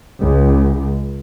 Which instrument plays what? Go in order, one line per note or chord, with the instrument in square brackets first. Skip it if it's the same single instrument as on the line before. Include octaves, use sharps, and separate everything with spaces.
[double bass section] C#2